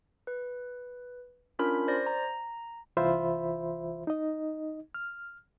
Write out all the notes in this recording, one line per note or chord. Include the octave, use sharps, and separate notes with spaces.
B4
C#4 D4 F4 A#4 B5
C5 D5 A#6
A#5
C2 E3 F4 C5 E5 B5
D#4 D#5
F6